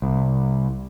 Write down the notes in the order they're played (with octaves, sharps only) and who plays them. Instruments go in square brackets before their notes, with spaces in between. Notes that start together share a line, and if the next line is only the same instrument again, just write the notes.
[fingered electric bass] C2